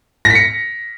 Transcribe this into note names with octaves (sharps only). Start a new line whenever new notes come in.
A#6
B6
C#7